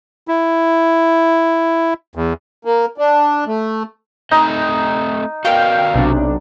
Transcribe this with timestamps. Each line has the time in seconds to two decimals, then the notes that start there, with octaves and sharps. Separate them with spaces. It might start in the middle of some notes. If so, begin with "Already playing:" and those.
0.28 E4
2.15 E2
2.65 A#3
2.98 D4
3.47 A3
4.31 A3 C4 D#4 D#5
5.45 F#4 A#4 D5 F5 G5
5.94 B1 C3 D4